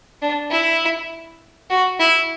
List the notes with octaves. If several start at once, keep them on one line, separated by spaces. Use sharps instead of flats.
D4
E4
F#4
E4